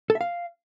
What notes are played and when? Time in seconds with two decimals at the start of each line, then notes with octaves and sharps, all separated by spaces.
0.10 A4
0.15 E5
0.21 F5